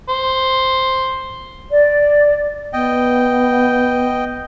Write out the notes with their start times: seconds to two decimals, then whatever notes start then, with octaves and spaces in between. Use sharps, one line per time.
0.09 C5
1.71 D5
2.73 B3 D#5 G5